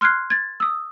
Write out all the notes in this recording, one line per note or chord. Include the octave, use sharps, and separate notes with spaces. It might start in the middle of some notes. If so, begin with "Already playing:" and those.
C6 F6 F#6 G#6 C7
G#6 A6
D#6 E6